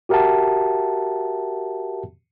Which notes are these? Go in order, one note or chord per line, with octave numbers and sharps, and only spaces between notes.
F#4 G4 A#4 E5 F#5 A5